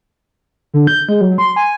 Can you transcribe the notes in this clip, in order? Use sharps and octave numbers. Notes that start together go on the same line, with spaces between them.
D3
G6
G#3
F#3
C6
G#5